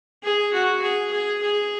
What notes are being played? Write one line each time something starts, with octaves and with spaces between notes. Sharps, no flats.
G#4
F#4
G#4
G#4
G#4